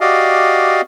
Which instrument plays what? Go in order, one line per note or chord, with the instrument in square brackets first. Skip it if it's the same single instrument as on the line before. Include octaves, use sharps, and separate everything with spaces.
[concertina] F#4 G4 D5 D#5 F5